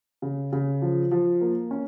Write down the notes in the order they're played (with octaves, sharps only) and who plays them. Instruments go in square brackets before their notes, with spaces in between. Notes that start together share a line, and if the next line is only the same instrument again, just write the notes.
[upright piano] C#3
C#3
F3
F3
A#3
C#4